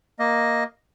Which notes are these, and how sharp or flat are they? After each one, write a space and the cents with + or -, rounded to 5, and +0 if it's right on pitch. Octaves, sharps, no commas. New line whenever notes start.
A#3 +0 D#5 +0